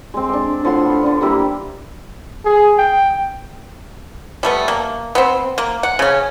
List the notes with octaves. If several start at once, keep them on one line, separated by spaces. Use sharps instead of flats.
G#3 C4
D4 D6
A2 F3 F#5 C6
B3
D3 D4
G3 A#3 E4 G4
G#4
G5
G3 A3 B3
A#3
B3 C4
A#3
F#5
C#3 C#4